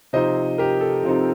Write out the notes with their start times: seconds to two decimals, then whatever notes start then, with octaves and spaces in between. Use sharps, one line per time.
0.13 C3 F3 C4 D#4 C5 D#5
0.58 G4 A#4
0.81 A4
1.03 C3 F3 C4 D#4